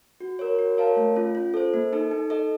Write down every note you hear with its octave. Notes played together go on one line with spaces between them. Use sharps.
F#4
A#4 C#5
F#4
A#4 C#5 F5 A5
A3
C#4 F4
F4
A4 C5
A#3
D#4 A4
D#4
A4 D#5